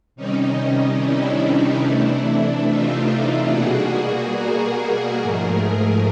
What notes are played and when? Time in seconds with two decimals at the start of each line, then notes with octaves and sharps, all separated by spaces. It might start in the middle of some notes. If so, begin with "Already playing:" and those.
0.16 C3 D#3 G3 C#4 D#4
0.58 C#4 D#4
1.00 D4 E4
1.84 C3 E3 A3
2.68 D#4 F4
3.51 B2 G3 A#3 F#4 G#4
4.35 G#4 A#4
5.18 G#2 F3 A3 G#4 A#4